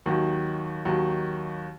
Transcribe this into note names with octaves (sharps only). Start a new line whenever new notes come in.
D#2 D#3 F#3
D#2 D#3 F#3